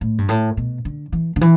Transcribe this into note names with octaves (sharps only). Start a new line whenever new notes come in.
A2
G2
A2
B2
D3
E3
D3
E3